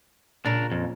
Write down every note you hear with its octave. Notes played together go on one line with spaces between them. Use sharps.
A#2 C#3 C#4 D4 A#4
F2